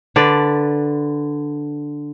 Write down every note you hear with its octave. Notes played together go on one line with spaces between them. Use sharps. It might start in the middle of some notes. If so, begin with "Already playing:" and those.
D3 B4 D5